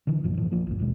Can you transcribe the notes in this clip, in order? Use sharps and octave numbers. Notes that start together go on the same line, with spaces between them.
D3 E3
A1 F#2 F3 A#3
A2 E3 F3
A#1 F3 A#3
A1 D2 G#2
D1 D#2 B2 G#3